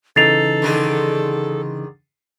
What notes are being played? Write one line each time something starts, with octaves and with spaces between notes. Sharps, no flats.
C#3 E3 D#4 A4 A6 C7 F7
D3 D#3 G#4